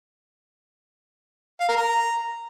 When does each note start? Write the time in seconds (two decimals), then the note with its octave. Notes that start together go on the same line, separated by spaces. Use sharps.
1.60 F5
1.68 A#4
1.77 A#5